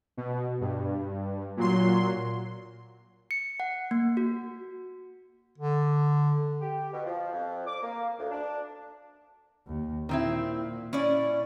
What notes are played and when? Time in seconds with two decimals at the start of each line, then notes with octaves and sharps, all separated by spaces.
0.17 B2
0.61 G2
1.57 A#2 F#3 C6
3.31 C#7
3.60 F#5
3.91 A#3
4.17 F#4
5.58 D3
6.61 G4
6.93 B2
7.05 F3
7.32 F2
7.67 D6
7.82 A#3
8.19 D2
8.31 D4
9.67 D#2
10.09 A#2 D#3 C4 E4
10.93 C#4 E4 D5